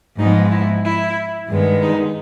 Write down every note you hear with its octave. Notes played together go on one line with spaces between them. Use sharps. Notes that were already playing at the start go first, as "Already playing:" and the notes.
G#2 F3 G#3 B3 D#4
E4
E4
G2 D#3 G#3 B3
D#4